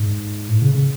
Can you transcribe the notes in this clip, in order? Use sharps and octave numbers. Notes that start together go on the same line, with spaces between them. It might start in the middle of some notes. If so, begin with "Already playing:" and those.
Already playing: G#2
A2
C#3
C#3